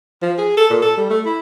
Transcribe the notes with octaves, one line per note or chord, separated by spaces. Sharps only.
F3
G#4
A4
A#2
A4
G3
A3
E4